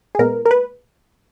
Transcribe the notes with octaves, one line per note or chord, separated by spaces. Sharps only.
G#4
A#2 G#3 B3 A#4
A#4
B4